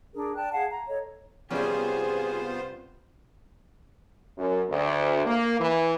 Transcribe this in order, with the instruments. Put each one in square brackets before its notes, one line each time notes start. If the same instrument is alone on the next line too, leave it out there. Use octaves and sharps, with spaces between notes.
[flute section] D4 G#4 A#4
D5 G5 A5 F#6
G#4 F5 F#5 A5
A#5
A4 C#5 D#5
[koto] C3 G3 C#4 [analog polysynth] B3 F4 C5 [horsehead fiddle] G#4
[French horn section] F#2
D2
A#3
E3